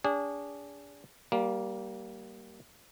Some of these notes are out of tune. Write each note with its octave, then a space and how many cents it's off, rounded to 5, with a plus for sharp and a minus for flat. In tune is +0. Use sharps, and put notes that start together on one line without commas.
D4 -35 G#4 -30
G3 -25 A#3 +0